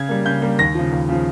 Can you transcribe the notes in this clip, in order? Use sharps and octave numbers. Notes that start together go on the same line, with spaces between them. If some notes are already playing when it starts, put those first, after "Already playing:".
Already playing: C#3 G#6
G3 A#3
C#3 G6
G3 A#3
D#2 A#6
C#3 F3
D#2
C#3 F3